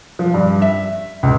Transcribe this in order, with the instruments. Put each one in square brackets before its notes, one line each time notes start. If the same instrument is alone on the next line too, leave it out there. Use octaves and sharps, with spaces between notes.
[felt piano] F3
G2
E5
C#2